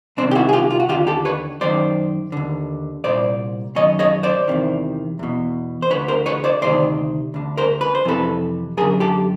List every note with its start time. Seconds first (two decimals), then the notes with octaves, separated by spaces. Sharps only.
0.17 C2 C3 D#3 C4 D4
0.31 G4
0.35 E4 F#4
0.49 G#4
0.53 F4 G4
0.70 F4
0.80 F#4
0.89 D#2 D3 F4 G4
1.07 G4 A4
1.25 B4 C#5
1.61 F#2 D#3 C5 D5
2.32 D#2 D3
3.04 C2 A#2 C5 D5
3.75 F#2 D#3 C#5 D#5
3.99 C#5 D#5
4.23 C5 D5
4.48 E2 C3 D#3
5.19 E2 B2
5.82 C5
5.90 D2 D3 B4 C#5
6.08 A#4 C5
6.26 B4 C#5
6.44 C5 D5
6.62 D2 C3 D#3 C5 D5
7.34 D2 D3
7.57 A#4 C5
7.81 B4
7.95 C5
8.05 F2 C3 E3 A4 B4
8.77 F#2 G#4 A#4
8.81 D3
9.00 G4 A4